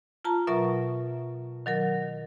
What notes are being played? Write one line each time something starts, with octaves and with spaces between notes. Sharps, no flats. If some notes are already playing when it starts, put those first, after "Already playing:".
F4 A5 A#5
B2 F#3 A#4 E5 C#6
D#3 F#3 A#4